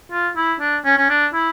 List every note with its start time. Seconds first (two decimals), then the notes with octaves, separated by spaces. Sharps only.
0.11 F4
0.36 E4
0.60 D4
0.85 C#4
0.97 C#4
1.09 D4
1.33 E4